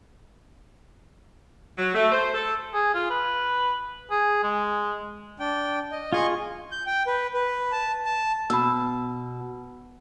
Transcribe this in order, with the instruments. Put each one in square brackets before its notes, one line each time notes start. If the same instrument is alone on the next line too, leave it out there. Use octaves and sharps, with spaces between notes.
[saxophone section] F#3
A3
C5
A4
[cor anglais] G#4
F4
B4
G#4
G#3
[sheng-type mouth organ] D4 G5
D#5
[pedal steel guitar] F4 G#4 C6 [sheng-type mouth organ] D#5 G#5 C#6
[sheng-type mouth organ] G6
G5
B4
B4
A5
A5
[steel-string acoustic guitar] B2 [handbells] B5 E6